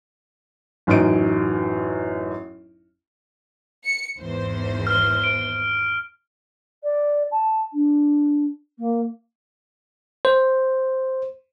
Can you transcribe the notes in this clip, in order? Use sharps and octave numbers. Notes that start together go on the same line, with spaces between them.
A1 F#2 D#4 D#5 D7
C#7
G#1 E2 C5
F6
D7
D5
A5
D4
A#3
C5